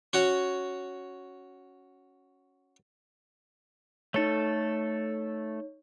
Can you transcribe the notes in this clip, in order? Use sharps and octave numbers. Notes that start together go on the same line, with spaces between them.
C#4 F#4 C#5
A3 D#4 A4 C#5